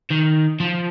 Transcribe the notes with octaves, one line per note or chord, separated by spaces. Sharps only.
D#3
F3